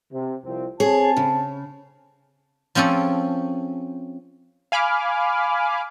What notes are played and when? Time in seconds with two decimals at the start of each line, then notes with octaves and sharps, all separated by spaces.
0.12 C3
0.44 C2 F3 C4
0.80 C4 G#4 C#5 A5
1.17 C#3
2.75 F3 C4 C#4 G#4 A4
4.72 F5 G#5 B5 D6 F6